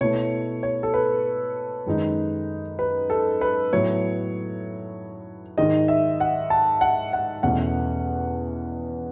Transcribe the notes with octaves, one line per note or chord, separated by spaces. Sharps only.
B2 A3 E4 C#5
C#5
A4
B4
F#2 D#3 G#3 D#4
B4
A4
B4
A2 F#3 B3 C#5
G#2 D#3 G#3 D#5
E5
F#5
A5
F#5
F#5
E2 B2 A3 C#4 F#5